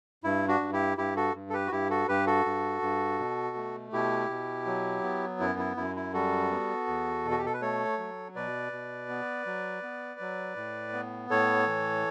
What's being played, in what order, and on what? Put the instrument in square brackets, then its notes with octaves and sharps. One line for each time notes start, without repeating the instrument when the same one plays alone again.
[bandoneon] G2 E4
D4 F#4
G2
E4 G4
G2 E4 G4
F#4 A4
G2
A4
G4 B4
F#4
G2 E4 G4
F#4 A4
G2 G4 B4
F#4 A4
G2
G2
B2
A3
B2 E4 G4
B2
F#3
B3
F#2 E4
E4
F#2 E4
E4
G3 F#4 A4
B3
E2
B2
F#4
G4
A4
B4
A3 A4 C#5
F#3
B2 B4 D5
B2
B3
F#3
B3
F#3
A2
B3
A2 A4 C#5
E3